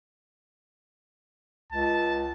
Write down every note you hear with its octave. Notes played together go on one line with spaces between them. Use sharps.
C#2 A5